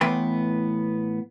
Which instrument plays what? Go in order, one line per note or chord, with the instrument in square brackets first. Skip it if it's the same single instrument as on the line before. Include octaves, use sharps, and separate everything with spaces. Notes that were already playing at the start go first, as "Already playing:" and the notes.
[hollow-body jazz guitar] A2 E3 B3 B4 G5 C6